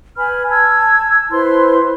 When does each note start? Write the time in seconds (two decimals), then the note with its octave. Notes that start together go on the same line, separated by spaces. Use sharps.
0.17 B4 G#5 B5 F6
0.49 A5 E6 G#6
1.31 E4 B4 C5 C6